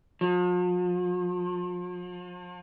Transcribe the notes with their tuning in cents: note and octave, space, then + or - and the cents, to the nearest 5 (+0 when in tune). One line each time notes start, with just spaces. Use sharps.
F3 +40